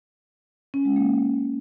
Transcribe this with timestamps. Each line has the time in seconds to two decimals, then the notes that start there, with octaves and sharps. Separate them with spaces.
0.74 C#4
0.85 G#3
0.96 A#3